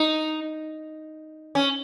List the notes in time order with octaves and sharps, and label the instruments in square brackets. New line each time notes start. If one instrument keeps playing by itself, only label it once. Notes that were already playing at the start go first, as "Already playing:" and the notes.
Already playing: [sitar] D#4
C#4